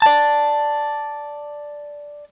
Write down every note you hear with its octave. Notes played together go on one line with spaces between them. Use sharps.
D5 A5